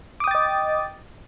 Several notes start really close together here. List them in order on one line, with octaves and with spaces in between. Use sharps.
D6 D#6 G5 A6 D#5